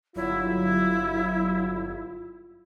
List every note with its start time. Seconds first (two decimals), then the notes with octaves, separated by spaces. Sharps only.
0.15 G1 F#3 E4 F4